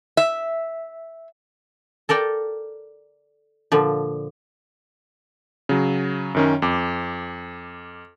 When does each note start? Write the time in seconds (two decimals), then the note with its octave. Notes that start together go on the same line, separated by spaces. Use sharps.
0.17 E5
2.09 A4 A#4 D5 G5
3.72 A#2 D3 F3
5.69 C#3 F#3
6.34 F#2 D#3 C#4
6.62 F2 D6